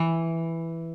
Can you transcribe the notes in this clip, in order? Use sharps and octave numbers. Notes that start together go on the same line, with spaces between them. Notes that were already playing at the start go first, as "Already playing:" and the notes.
Already playing: E3